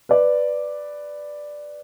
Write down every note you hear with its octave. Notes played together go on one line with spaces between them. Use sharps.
B4 D5